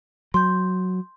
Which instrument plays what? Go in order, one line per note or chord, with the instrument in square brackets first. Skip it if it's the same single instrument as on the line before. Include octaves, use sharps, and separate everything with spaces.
[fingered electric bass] F#3 [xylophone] C6 G6